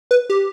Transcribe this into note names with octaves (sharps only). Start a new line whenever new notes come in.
B4
G4